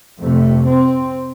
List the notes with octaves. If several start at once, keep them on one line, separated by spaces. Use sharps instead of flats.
F2 C3 A3
C4